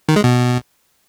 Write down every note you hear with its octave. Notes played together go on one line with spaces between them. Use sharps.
D#3
G#3
B2